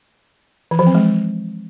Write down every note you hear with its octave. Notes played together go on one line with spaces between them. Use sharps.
E3
F3
C4
G#3